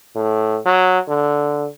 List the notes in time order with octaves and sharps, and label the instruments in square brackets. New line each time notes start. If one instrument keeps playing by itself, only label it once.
[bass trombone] A2
F#3
D3